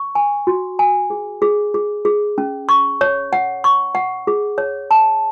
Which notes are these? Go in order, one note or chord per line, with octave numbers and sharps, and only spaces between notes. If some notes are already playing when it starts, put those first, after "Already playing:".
Already playing: C#6
G#5
F#4
G#5
G#4
G#4
G#4
G#4
C#4
C#6
C#5
F#5
C#6
F#5
G#4
C#5
A5